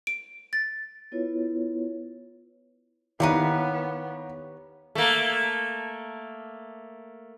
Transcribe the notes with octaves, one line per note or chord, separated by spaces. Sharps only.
D7
A6
B3 E4 F4 B4 C#5
D#3 B3 E4 G4 B4 C#5 F5 A#5
A3 A#3